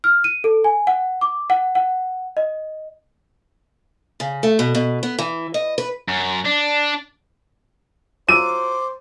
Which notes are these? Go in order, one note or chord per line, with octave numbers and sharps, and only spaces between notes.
F6
D#7
A4
G#5
F#5
D6
F#5
F#5
D#5
C#3
A3
B2
B2
B3
E3
D#5
B4
F#2
D4
F#3 F4 C5 D6 E6 D#7